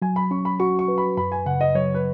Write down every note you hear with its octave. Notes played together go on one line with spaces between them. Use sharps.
F#3 G#5
B5
C#4 C#6
B5
F#4 C#6
C#6
B4
B5
F#2 B5
G#5
C#3 F#5
D#5
F#3 C#5
B4